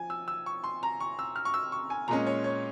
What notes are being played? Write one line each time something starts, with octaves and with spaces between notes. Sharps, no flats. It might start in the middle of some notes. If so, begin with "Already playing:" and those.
Already playing: F3 G#5
E6
E6
C#6
C6
A#5
C#6
E6
F6
C#6
E6
C#6
G#5
A#2 G#3 C#4 A#5
C#5
C#5